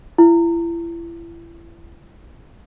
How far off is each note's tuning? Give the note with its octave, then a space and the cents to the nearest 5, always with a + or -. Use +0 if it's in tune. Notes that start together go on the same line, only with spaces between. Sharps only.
E4 +35